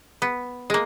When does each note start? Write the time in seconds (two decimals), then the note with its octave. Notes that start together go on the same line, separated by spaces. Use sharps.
0.22 B3
0.70 G#3 A#3